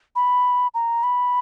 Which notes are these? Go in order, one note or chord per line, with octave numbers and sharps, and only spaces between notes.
B5
A#5
B5